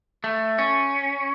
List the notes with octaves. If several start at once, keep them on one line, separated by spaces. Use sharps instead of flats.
A3
C#4